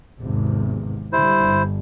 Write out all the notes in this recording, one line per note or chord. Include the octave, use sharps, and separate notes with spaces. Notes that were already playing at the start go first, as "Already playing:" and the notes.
G#1 E2 C3
D3 G3 E4 C5
G1